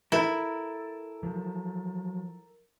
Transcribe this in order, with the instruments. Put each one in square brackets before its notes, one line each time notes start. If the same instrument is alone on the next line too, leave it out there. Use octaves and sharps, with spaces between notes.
[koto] E4 [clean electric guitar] A4 A#4
[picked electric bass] F3 F#3